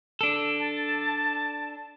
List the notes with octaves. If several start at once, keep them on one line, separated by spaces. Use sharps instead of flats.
D4 A4
A5